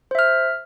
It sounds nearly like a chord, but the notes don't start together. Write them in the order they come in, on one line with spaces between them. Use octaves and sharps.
C5 E5 F6